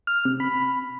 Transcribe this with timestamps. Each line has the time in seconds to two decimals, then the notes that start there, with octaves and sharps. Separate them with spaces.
0.07 F6
0.25 C3
0.40 B5